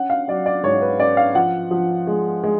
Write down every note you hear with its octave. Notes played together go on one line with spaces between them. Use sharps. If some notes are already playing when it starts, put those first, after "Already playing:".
Already playing: C#4 F#5
F5
F#3 D5
D5
G#2 C#5
B4
C#4 D5
F5
F3 F#5
F3
G#3
G#3